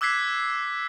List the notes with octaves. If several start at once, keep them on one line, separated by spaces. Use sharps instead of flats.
D6 E6 F#6 G#6 B6 C7